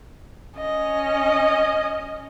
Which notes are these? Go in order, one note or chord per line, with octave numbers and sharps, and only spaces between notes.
C#4 D#5